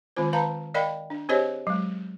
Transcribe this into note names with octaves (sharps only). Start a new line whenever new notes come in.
D#3 G#3 C4 F4 C5
D#3 B4 F5 A5 A#5
A#4 D5 D#5 F5 G5 B5
D4
C4 G4 G#4 C5 C#5 D#5
F#3 G#3